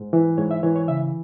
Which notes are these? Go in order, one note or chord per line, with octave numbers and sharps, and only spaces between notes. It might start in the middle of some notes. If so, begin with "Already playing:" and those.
Already playing: G#2
E3
G#2 C#5
E5
E3 C#5
C#5
C#3 E5